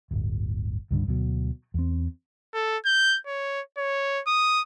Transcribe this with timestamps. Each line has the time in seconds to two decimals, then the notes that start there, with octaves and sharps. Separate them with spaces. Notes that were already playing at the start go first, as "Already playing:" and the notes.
0.11 D1 G1
0.91 C#2 G2 D3
1.07 D2 B2 F#3
1.74 E2 C4
2.54 A4
2.85 G6
3.27 C#5
3.78 C#5
4.27 D#6